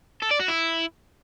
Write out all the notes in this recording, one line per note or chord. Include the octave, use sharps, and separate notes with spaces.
A4
D5
F#4
E4